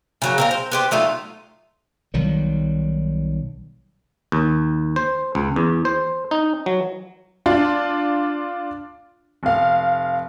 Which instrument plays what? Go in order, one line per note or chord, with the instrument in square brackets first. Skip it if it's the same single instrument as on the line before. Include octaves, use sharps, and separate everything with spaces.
[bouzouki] C#3 F#3 A#3
C4 A#4 F5
C5
B3 G4 C5
F#3 A3 D#4 F4
[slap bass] B1 D#3 F#3 G3
[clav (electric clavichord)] D#2
C5
C#2
E2
C5
D#4
F#3
[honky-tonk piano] D4 F4
F1 F5